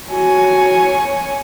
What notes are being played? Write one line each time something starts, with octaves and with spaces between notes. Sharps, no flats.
F#4 C#5 G#5